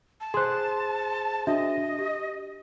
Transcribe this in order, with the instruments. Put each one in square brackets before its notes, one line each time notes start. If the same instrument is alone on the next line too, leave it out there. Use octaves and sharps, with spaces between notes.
[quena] A5
[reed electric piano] G#4 C5 [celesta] C6 F#6
[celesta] D4 F#4 E5 [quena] D#5
[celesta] G4